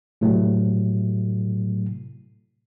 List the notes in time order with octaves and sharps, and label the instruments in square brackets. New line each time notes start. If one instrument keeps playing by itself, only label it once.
[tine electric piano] A2 C3 F#3 A3